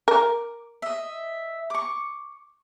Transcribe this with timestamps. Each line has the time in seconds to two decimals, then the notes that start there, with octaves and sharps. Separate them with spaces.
0.08 A#4 D6
0.82 D#5 E5
1.70 C#6 D6